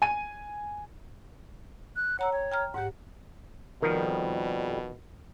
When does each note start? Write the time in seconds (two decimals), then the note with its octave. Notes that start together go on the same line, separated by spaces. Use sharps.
0.02 G#5 D#7
1.96 F#6
2.19 C#5 F#5 A#5 E6
2.32 C#5 G5
2.52 G5 A#5 F6
2.74 G#2 G4 F#5
3.83 F2 B2 D#3 F3 G3 A#4